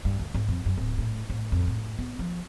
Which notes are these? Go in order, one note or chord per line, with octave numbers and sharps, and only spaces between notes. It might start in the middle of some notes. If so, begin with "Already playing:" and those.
G2
D2
G#2
F2
F#2
D1
A2
A2
F2
A2
B3
F3